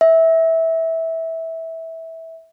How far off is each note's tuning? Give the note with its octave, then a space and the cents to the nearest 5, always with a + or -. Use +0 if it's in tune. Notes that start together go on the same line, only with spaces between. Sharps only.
E5 -15